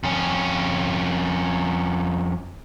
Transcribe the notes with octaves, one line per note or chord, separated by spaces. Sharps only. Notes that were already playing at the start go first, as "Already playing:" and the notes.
F2 C#4